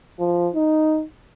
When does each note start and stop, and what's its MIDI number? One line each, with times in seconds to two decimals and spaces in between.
0.19 0.49 53
0.54 1.03 63